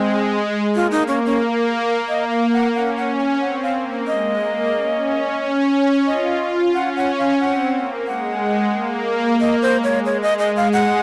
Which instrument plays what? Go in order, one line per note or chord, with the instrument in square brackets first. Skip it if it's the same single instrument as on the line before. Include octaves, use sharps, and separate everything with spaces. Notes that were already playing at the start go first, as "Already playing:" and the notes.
Already playing: [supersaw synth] G#3 [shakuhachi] C4
[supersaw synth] A#3 [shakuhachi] F4
[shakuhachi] D#4
[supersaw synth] A#3 [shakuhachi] C#4
[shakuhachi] C#4
[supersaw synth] A#3 [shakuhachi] D#5
[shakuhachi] F5
F#5
[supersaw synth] C#4 [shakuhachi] F#5
[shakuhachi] F#5
[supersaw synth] C#4
[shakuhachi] G#5
[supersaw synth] C4 [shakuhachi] F#5
[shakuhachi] F5
[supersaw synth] A#3
[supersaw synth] G#3 [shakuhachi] D#5
[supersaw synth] A#3
C#4
C#4
[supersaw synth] F4 [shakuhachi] D#5
[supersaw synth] F4
[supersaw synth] C#4 [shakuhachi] F#5
[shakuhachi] F#5
F5
[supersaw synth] C4 [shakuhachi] F#5
[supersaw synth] A#3
[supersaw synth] G#3 [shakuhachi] F#5
[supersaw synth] A#3
[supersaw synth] A#3 [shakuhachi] D#5
[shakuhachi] C5
[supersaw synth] G#3
[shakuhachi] C#5
[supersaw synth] G#3 [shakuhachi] C#5
[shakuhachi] D#5
D#5
F5
F#5